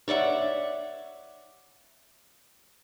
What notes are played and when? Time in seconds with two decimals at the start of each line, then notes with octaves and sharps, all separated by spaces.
0.08 C#5 D5 E5 F#5